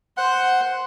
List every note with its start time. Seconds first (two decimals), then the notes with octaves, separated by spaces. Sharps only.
0.17 C5 F#5